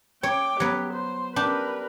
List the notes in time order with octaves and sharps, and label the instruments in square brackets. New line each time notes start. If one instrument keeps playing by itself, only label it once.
[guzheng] C#5 [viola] G5 D6
[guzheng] F#3 B3 [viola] G4
[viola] C5
[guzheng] D4 G4 [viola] A#4 B4